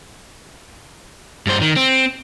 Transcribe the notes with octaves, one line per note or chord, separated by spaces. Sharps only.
G2 C5
D#3
C4